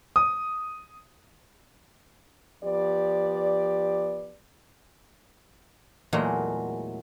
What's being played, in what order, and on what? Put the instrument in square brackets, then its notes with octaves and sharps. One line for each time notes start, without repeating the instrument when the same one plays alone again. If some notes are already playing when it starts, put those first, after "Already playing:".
[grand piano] D#6
[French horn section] F3 B3 G4 D5
[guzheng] E2 A#2 F#3 G#3 A3